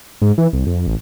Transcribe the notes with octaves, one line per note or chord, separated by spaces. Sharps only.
G#2
E3
C2
F2
A1